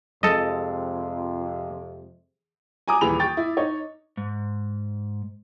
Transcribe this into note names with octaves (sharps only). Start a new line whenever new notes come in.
F2 C3 G#3 A4 D#5
G#5 A#5 D6 D#6
D#1 E3 G#4 B5 F7
G5 C#6 A6
E4
D#4 C#5
G#2